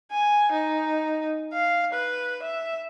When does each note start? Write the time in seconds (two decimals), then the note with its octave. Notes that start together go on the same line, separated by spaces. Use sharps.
0.11 G#5
0.52 D#4
1.53 F5
1.93 B4
2.43 E5